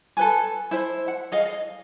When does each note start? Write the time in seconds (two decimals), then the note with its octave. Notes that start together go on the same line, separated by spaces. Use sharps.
0.17 A4 B4 G#5
0.71 E4 C5 E5
1.08 F#5
1.32 G#4 D#5 F5
1.45 D#5